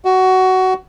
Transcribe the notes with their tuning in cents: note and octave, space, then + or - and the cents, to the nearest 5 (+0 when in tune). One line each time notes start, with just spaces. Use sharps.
F#4 +15